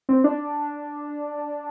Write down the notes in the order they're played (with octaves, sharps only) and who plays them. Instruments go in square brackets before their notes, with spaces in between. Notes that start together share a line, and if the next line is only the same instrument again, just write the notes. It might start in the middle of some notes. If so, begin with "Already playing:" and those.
[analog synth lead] C4
D4